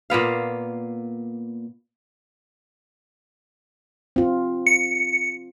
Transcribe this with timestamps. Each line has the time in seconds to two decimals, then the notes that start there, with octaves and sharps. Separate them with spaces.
0.10 A#2 A#3 B3 F5
4.16 C4 F4
4.66 C#7